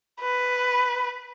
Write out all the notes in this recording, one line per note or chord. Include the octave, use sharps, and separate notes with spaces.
B4